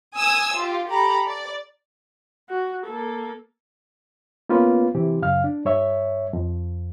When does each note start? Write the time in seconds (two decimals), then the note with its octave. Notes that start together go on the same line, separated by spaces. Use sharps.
0.16 G#5 D#6 E6
0.57 F4 G4
0.89 G4 A4 A#5 B5
1.27 D5
2.49 F#4
2.86 A#3 A4
4.49 A#3 B3 C#4 F4 B4
4.95 C3 E3 C4 G4
5.22 F#2 C#3 F5 F6
5.44 D4
5.65 G2 C#5 E5
6.33 F2